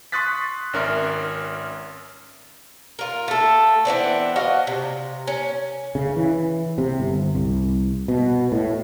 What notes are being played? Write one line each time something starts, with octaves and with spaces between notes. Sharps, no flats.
C6 C#6 D#6 F#6 A6 B6
G#1 C#4 A#4 D5 E5 C6
F4 A#4
A3 A4
E3 B3 C4 D4
F#4 D#5 F5
C3
C#4
C#3
E3
C3
G1
C2
B2
A2